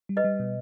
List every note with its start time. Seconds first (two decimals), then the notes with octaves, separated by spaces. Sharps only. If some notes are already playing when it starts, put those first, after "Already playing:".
0.09 G3
0.17 B4 D#5
0.24 G3
0.40 B2